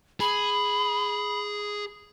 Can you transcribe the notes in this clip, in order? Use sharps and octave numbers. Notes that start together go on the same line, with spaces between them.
G#4 B5